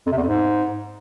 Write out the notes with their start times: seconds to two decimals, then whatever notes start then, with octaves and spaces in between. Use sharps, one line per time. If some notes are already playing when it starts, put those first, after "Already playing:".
0.07 F2
0.12 C3
0.17 E2
0.22 F2
0.27 G#2